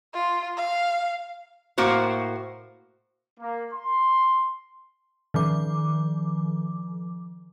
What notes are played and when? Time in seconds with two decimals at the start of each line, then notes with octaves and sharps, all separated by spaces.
0.13 F4
0.57 F5
1.78 A2 A#3 F#4 C5
3.40 A#3
3.73 C6
5.34 D#3 F3 D6